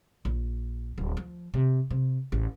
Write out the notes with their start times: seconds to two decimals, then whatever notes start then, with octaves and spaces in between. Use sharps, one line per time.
0.25 A#1
0.98 D1
1.17 F3
1.54 C3
1.91 C3
2.32 A1